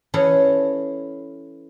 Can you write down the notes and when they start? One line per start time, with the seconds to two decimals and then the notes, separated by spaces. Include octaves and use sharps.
0.14 E3 C#4 E4 G#4 A4 C#5